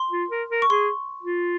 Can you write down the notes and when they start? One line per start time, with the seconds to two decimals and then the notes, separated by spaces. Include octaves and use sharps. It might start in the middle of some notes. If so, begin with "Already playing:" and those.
Already playing: C6
0.11 F4
0.30 A#4
0.49 A#4
0.62 C#6
0.70 G#4 C6
1.22 F4